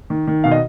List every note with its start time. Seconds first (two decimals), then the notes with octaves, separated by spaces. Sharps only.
0.10 D#3
0.27 D#3
0.44 B2 F5
0.52 D#5